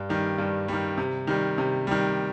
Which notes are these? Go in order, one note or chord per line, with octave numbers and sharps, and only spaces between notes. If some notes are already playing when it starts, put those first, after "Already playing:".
Already playing: G2
D#3 G3
G2
D#3 G3
C3
D#3 G3
C3
D#3 G3